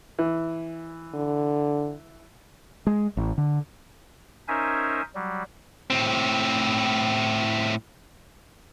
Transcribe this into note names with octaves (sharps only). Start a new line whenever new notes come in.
E3
D3
G#3
A1
D3
C#4 D#4 A#4 C5 E5 G#5
F#3 G3
A2 C4